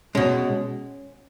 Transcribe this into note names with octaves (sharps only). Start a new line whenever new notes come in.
B2 G#3 C#4